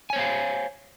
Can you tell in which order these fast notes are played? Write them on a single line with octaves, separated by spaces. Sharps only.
G#5 C#5 C5 F5